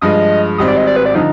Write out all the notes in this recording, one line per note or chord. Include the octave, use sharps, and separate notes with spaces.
G2 F3 G#3 D#5
G#1 G#2 G3 C4 D#5
D5
D#5
D5
B4
D5
D3 F3 D#4